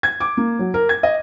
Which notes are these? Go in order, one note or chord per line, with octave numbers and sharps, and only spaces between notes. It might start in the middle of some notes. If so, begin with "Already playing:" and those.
G#6
D6
A#3
F#3
A#4
G#6
D#5